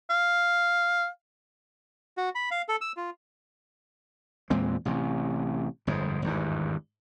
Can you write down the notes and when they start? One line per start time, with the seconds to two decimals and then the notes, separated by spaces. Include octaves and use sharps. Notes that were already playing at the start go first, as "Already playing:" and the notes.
0.10 F5
2.17 F#4
2.35 B5
2.51 F5
2.68 A4
2.81 E6
2.97 F4
4.50 E2 A#2 G#3 C4
4.85 A1 C3
5.87 G1 F2 G#2
6.22 G#1 E2 G2